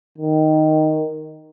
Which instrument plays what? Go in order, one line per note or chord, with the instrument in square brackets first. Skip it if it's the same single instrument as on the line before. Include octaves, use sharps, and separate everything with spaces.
[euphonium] D#3